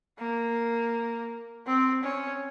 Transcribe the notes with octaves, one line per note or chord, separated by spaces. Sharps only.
A#3
C4
C#4